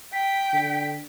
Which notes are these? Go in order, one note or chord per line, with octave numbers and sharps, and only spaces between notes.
G5 B6
D3